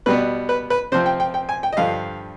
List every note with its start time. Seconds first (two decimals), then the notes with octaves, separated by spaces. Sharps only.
0.06 B2 G3 B3 B4
0.49 B4
0.70 B4
0.92 C3 F3 C4 C5
1.06 G5
1.20 G5
1.34 G5
1.49 G#5
1.63 G5
1.72 D#5
1.77 G2 D3 F3 F5